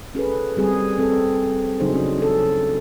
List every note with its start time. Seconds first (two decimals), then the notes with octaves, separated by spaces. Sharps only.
0.15 C#4 G#4 A4 B4
0.57 G3 C4 G#4
0.99 C4 A4
1.80 C#3 F#3 D4 D#4 G#4 C5
1.94 C#4
2.18 C#4 A4